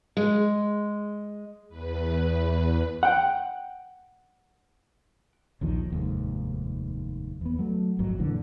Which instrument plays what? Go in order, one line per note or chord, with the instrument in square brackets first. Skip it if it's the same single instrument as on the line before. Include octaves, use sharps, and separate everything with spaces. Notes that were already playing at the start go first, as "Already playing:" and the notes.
[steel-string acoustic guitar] G#3
[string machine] E2 B4
[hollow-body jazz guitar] F#5 G5
[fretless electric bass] A#1 D#2 D#3 F3
F1 D#2 G#2
E2 B3
F#3 A3
G#1 F2 F#3
F#2 A#2 D3 E3